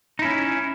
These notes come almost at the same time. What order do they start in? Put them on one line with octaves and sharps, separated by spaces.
D#4 E4 C#4